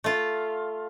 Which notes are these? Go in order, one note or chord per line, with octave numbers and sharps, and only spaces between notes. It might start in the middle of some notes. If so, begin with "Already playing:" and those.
A3 F4